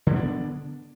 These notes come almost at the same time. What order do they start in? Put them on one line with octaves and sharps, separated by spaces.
D3 G#3 B3 D4